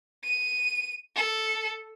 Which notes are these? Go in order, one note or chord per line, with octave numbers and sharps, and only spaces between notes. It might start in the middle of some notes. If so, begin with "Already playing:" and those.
D#7
A4